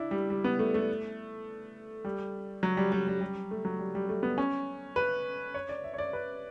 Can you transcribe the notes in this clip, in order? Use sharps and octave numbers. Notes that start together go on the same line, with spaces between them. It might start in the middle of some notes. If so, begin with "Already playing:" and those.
Already playing: D4 E4
G3
G3
B3
A3
A3
G3
F#3
G3
G3
G3
G3
A3
F#3
G3
G3
A3
B3
C#4
B4
C#5
D5
E5
C#5
D5
B4